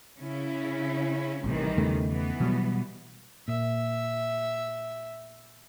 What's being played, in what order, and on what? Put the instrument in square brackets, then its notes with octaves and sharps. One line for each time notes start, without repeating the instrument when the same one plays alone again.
[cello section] C#3 C#4 E4
[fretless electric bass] A1 A2 C3 [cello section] D#3 E3 G3
[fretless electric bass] E2 C#3 A3
[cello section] E3 B3
[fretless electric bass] B2 F#3 G3
[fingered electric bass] A#2 [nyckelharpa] E5